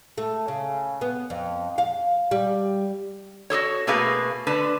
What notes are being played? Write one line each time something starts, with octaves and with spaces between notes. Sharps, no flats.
A3
C#3
B3
F2
F5
G3
F#4 G#4 A4 C#5
B2 A3 A#3 G#4 B4 F5
D3 B4 A5